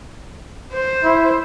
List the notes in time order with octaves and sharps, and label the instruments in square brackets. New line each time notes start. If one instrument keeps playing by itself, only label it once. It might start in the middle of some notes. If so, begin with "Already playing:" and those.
[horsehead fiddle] C5
[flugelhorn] E4